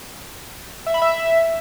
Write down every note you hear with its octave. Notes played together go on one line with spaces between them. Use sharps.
E5
B5
E5